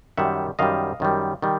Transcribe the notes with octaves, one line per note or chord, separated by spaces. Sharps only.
F#2 D#3 G3 E5 F#5
F#2 D#3 G3 D#5 F5
F#2 D#3 G3
D#3 G3